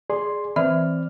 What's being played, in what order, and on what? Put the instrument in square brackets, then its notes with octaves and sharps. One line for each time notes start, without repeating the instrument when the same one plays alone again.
[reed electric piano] G#4 D5 C6
[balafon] E3 E5 [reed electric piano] C4 D5 F6